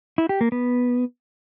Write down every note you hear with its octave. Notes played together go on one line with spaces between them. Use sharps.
E4
G4
A#3
B3